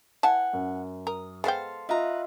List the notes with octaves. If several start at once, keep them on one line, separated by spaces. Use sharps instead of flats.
E3 F#5 G#5 A5
F#2
A#4 D#6
G#3 B3 A4 C5 F5 G5
F4 B4 D#5 E5 A#5